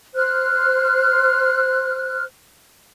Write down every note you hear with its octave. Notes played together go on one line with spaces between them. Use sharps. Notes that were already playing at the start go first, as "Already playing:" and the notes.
C5 F6 F#6